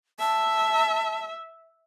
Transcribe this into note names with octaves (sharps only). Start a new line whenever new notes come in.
E5 A5